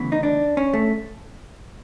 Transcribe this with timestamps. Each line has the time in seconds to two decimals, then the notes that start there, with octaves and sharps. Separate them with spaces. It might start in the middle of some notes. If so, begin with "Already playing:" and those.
Already playing: D2 C#3 E3 B3
0.12 D#4
0.23 D4
0.57 C#4
0.74 A3